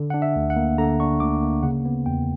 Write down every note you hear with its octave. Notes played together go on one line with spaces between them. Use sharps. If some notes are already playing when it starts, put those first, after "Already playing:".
Already playing: D3
D4 F#5
E5
D2
F#5
A#3
D3 A#5
D4 C#6
D2 D6
A#3
C#3 F#5
B3
E2 G5